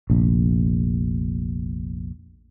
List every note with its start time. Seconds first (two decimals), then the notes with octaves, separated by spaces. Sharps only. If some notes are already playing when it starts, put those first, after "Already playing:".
0.10 F1 A#1